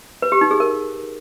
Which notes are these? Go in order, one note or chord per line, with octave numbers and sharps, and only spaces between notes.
B4
G4
D#4
G#4
A#4